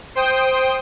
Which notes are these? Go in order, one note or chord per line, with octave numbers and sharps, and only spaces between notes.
C5 G5 D#6 G6